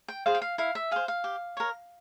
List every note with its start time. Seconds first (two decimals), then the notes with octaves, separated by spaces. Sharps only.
0.08 G5
0.26 G#4 C5 F5
0.35 G5
0.42 F5
0.58 E4 F5
0.75 E5
0.91 G#4 C5 F5
1.08 F5
1.24 G4
1.57 A#4 C#5